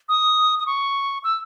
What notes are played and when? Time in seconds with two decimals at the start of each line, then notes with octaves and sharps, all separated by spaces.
0.09 D#6
0.59 D#6
0.66 C#6
1.24 E6